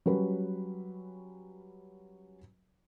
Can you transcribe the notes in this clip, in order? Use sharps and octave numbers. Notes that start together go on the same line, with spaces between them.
F#3 G3 C#4 B4